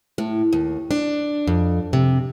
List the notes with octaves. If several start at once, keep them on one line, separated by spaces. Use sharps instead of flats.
A2
D#2
D4
F2
C3